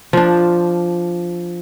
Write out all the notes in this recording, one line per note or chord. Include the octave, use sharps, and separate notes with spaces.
F3 D4